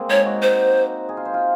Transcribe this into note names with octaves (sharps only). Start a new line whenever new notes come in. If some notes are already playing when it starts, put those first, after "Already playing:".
Already playing: G#3 A#3 C4
D#4 C#5
F#4
C5
G#4
F4
C5
F4